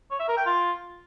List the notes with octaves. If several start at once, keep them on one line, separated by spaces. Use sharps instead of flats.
C#5
E5
A#4
G5
F4